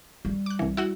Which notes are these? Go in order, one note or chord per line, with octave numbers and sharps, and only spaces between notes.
G3
D6 F#6
C2 E3
E4 F#4 F#5